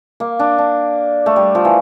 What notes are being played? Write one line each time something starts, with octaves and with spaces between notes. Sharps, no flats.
A#3
D4
D4
A3
G3
F3
E3